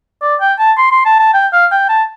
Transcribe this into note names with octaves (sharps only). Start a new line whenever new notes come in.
D5
G5
A5
C6
C6
A5
A5
G5
F5
G5
A5